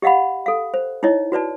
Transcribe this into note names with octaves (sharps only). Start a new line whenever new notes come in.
G4 D#5 F5 F#5 B5
A4 F5
C5
D#4 E4 C#5 D#5
F#4 B4 D5 A5